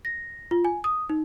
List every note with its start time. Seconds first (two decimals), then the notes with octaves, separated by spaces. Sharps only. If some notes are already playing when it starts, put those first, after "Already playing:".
0.05 A#6
0.51 F4
0.65 G#5
0.84 D#6
1.09 D#4